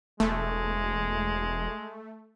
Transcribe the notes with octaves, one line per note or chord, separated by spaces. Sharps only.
E1 G#3 A3